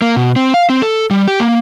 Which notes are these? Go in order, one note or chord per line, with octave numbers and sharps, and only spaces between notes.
A#3
B2
C4
F5
C4
A4
G3
G4
A#3